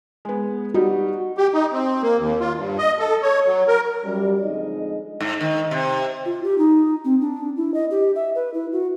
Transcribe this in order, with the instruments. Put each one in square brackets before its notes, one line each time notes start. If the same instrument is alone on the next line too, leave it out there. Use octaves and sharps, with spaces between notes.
[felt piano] G#3 B3
[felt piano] G3 D#4 [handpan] F#4
[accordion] G4
D#4
C4
A#3
D#2
F4
G2
D#5
A4
C#5
F#3
A#4
[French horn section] F#2 F#3 G3
F2 D3 G#3 D#4 D#5
[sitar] G#2
D#3
C3
[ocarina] F4
G4
D#4
C4
D4
E4
D#5
G4
E5
B4
E4
F#4